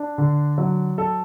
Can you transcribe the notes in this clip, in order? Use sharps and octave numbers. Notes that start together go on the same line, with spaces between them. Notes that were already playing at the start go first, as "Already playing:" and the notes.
Already playing: D4
D3
F#3
A4